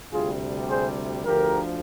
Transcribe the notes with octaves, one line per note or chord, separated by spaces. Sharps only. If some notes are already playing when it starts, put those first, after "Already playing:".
D2 C3 G3 F4 G#4
G#4 C5
D2 D3 F3 G4 A#4